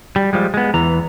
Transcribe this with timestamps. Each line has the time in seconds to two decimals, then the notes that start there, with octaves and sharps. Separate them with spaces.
0.16 G3
0.33 F3 G3 G#3
0.54 G#3 B3
0.74 E2 E3 A#5